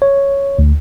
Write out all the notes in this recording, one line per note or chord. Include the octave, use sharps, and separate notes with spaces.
C#5
D2